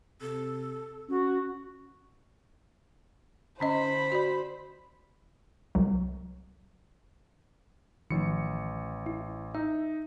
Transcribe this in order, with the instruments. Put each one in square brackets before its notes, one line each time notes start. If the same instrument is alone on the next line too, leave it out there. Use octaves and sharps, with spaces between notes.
[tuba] C3 [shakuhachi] A4
[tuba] C#4 [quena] F#4
[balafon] D3 C#4 D#5 [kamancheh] C5 B5
[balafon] F#4 D5
[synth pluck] C2 F#3
[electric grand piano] A1 C#7 [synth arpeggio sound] D#3 F3
[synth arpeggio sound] E4
[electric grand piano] D#4 [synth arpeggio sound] E5